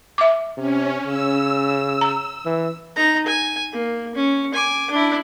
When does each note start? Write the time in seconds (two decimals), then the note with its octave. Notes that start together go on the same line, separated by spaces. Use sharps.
0.18 E5 D6
0.57 C3 C#4
1.06 C#3 E6
2.01 A#5
2.45 E3
2.96 D#4 A#5
3.26 G#5
3.73 A#3
4.15 C#4
4.54 G#5 D6
4.91 D4 E4